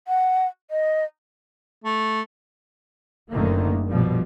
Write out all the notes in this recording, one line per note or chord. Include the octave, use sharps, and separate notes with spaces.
F#5
D#5
A3
F#1 F#2 D3 D#3 A3 A#3
A#1 B2 F3 G3